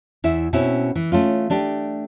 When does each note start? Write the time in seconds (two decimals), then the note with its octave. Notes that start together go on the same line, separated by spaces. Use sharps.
0.24 E2 E4 E5
0.53 B2 C4 C#4 E4
0.95 E3
1.12 A3 C#4 F4
1.50 A3 D4 G4